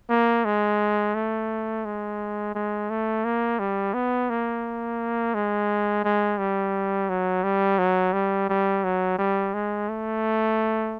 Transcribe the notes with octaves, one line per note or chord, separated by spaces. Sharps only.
A#3
G#3
A3
G#3
G#3
A3
A#3
G3
B3
A#3
G#3
G#3
G3
F#3
G3
F#3
G3
G3
F#3
G3
G#3
A3